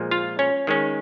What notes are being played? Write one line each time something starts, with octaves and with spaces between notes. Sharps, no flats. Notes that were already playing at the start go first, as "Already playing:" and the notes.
Already playing: A#2 F3 G#3
F4 F5
C#4 C#5
D#3 G#3 C#4